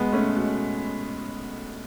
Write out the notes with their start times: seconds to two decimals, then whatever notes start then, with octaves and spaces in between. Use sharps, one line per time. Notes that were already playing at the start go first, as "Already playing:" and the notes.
Already playing: B2 G#3 B3
0.12 A3 C#4
0.36 B2